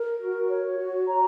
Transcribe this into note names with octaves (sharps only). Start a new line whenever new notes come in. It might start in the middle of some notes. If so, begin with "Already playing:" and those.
Already playing: A#4
F#4
C#5
F#4
A#5